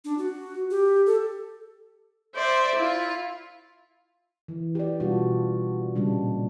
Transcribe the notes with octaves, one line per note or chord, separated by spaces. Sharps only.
D4
F#4
G4
A4
C5 D5 E5
E4 F4
E3
G4 D5
B2 G3 D4 F4 F#4
A#2 C#3 G3 G#3 D4